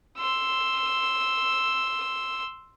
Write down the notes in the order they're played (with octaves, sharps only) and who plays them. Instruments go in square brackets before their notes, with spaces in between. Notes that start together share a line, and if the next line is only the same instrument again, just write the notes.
[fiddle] C6 E6